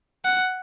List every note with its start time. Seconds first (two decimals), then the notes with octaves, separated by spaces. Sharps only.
0.25 F#5